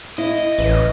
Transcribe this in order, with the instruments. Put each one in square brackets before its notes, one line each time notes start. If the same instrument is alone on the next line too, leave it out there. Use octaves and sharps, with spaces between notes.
[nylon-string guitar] E4 [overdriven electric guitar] D#5
[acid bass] A1 [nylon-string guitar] B4